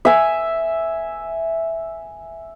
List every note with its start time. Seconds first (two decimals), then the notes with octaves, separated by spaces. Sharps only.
0.05 E5 G#5